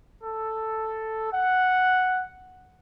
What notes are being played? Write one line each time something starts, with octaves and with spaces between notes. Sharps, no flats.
A4
F#5